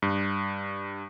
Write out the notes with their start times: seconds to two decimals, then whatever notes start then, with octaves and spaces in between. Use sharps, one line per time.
0.02 G2